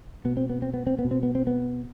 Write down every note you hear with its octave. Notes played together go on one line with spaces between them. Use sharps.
B2 B3
C4
B3
C4
B3
C4
B3
B2
C4
B3
C4
B3